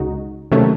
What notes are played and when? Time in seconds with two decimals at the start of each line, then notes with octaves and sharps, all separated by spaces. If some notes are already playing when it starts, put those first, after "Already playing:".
Already playing: C#2 C#3 G#3 D#4 F#4
0.52 C3 D#3 F#3 A3 C#4